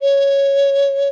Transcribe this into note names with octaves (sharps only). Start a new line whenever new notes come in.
C#5